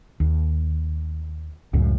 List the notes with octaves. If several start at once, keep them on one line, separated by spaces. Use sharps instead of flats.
D#2
C#2 F#2 A2